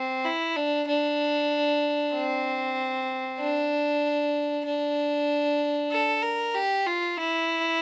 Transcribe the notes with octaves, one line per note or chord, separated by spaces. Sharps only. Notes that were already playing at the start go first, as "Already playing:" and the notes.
Already playing: C4
E4
D4
D4
C4
D4
D4
A4
A#4
G4
F4
E4